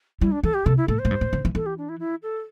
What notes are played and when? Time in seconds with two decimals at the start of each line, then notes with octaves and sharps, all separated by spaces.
0.21 G3 E4
0.32 D4
0.43 E3 A4
0.54 G4
0.65 C3 A4
0.77 E4
0.88 A2 A4
0.99 C5
1.05 A2
1.11 G2
1.21 A2
1.33 D3
1.45 E3
1.55 E3 A4
1.66 G4
1.78 D4
1.89 E4
2.00 E4
2.23 A4